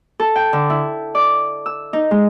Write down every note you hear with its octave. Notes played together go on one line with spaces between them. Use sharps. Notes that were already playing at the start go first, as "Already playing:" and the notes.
A4
G5
D3
E4
D5
E6
D#4
G#3